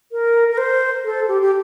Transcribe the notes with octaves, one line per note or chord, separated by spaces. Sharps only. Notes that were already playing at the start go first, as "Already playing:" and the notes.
A#4
A#4
C5
A4
G4
G4